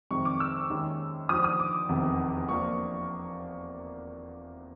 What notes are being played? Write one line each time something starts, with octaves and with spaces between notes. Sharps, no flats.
F2 C3 D#3 G#3 C#6
D6
E6
D#2 D#3 G#3 C#4
D#2 D3 F3 D#6
D#6
D6
F1 E2 C3 D#3
F3 A#3 D4 C#6